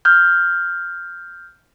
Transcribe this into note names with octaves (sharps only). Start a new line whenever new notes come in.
F6 G6